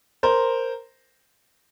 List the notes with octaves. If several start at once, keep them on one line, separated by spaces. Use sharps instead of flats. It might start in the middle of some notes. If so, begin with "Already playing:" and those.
A#4 C5